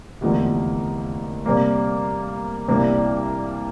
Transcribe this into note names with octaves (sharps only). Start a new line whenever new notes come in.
F1 E2 D3 F3 A#3
C3 G3 A#3
C2 C3 G3 A#3 D4